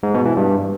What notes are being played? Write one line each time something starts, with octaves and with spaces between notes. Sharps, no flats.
G#2
B2
E3
G2